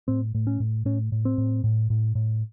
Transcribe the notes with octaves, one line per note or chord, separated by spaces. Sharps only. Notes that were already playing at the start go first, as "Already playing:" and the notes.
A2 C4
A2
C#4
A2
A2 C#4
A2
C4
A2
A2
A2
A2